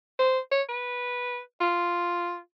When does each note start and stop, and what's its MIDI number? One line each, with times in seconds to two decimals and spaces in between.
0.19 0.39 72
0.52 0.62 73
0.69 1.40 71
1.61 2.38 65